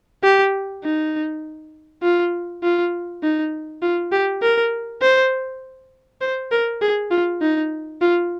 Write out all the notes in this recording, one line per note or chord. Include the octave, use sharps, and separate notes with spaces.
G4
D#4
F4
F4
D#4
F4
G4
A#4
C5
C5
A#4
G#4
F4
D#4
F4